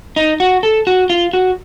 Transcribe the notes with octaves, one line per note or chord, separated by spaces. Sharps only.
D#4
F#4
A4
F#4
F4
F#4